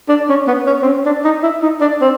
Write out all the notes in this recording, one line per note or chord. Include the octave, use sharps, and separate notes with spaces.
D4
C#4
B3
C#4
C4
C#4
D4
D#4
E4
D#4
D4
C4